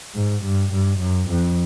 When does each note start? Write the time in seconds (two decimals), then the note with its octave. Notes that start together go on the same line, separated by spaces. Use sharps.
0.15 G#2
0.44 G2
0.72 G2
0.99 F#2
1.28 F2